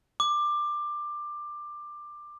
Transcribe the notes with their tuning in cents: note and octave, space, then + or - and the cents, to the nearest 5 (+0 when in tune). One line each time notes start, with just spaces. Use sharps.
D6 +15